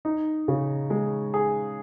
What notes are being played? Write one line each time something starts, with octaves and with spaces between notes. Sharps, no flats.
D#4
C#3
G#3
G#4